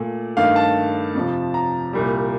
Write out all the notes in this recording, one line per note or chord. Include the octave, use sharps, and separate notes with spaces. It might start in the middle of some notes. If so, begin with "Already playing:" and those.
Already playing: A#2 A3
G2 D#3 A3 F5
A5
F2 C3 F3
A#5
C2 A#2 G3